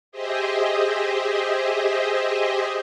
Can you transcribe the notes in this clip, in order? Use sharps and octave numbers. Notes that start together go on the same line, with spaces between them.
G4 G#4 C5 D#5 E5